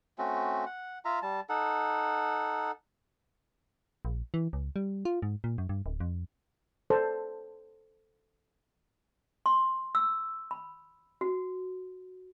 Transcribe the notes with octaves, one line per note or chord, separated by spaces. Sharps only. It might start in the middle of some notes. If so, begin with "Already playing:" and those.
A3 C4 C#4 F#4
F#5
F4 E5 F5 A#5
G3 A5
D#4 A4 F#5
A#1
E3
C#2
G3
F4
G#2
A#2
F#2
G2
D1
F2
A4 B4 C5 D5 A5
C6
E6
B5
F#4